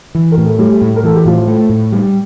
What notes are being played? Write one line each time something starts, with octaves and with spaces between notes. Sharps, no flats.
E3
A#4
A2
A4
G3 A3 G4
A2
A#4
E3 A4
G4
A2 F3 F4
A3
A2
G3